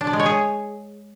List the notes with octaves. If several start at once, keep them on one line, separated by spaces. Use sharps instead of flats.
D4
D5
G#3
C#5
G#4